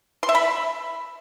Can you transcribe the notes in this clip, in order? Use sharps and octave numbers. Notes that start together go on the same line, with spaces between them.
C6
E5
B5